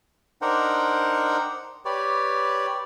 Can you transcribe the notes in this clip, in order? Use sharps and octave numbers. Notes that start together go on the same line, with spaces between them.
D4 D#4 A#4 C5 F#5 G5
G4 B4 C#5 D5